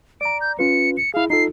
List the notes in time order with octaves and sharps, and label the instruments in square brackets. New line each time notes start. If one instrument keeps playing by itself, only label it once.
[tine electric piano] D5 A#5 [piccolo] D7
[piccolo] G6
[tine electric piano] C#4 F4 B4 [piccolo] C#7
[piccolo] C#7
[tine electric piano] E4 G#4 [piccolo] F5
[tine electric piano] D#4 F4 A4 [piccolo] C7